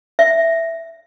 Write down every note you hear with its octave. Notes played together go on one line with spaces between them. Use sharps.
E5